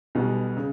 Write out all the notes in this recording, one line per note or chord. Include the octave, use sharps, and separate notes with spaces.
B1 B2 G3 B3
C#3